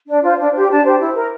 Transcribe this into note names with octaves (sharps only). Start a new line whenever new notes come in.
D4
F4 C5
D4
G4 C5
D4 A5
G4 C5
E4
A#4